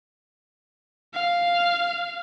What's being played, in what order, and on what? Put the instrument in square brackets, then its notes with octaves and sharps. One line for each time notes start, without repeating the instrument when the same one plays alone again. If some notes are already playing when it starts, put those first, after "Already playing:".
[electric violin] F5